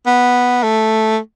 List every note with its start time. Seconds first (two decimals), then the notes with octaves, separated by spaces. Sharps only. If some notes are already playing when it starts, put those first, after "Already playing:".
0.06 B3
0.63 A3